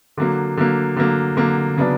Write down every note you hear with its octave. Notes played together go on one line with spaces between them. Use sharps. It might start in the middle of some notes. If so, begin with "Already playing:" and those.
D3 F#3 A#3
D3 F#3 A#3
D3 F#3 A#3
D3 F#3 A#3
C#3 F#3 B3 D4